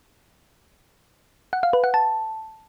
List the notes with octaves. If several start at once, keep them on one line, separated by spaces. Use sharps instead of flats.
F#5
F5
B4
F#5
A5